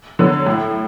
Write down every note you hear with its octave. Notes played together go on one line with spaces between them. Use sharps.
D3 F#3 B3
A2